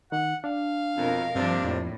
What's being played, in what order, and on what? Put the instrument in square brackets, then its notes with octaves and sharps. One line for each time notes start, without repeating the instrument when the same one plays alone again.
[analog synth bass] D#3 [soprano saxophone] F#5
[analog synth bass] D4 [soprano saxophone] F5
[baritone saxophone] F2 [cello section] B2 A#4
[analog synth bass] G2 [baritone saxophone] C3 [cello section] F3 A#3 D4
[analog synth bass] F2 [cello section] A2 A#3